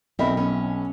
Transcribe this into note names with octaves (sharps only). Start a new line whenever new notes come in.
B1 C4 A#4 D#5 E5 B5
C#4